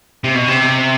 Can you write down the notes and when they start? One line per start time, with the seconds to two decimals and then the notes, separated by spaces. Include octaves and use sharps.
0.24 C3
0.35 B2
0.48 C3